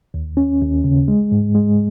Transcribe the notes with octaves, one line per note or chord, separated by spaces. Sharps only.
D#2
C#4
D#2
C#3
G#3
G#2
G#3